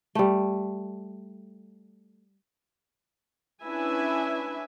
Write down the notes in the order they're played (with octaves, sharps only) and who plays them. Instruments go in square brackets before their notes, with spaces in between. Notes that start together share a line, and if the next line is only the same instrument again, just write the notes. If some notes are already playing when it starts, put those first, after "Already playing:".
[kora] G3 A3
[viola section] C#4 D4 E4 B4 E5 G#5